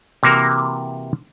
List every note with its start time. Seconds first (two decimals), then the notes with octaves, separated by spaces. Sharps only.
0.23 C3 E3 A#3 F#4 A#4